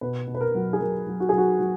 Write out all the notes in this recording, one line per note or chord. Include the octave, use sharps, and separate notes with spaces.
B2 B4
B2
B4
A#4
F#3
G#4
F#3 A#4
F#3
F#4
F#3 G#4
F#4
F#3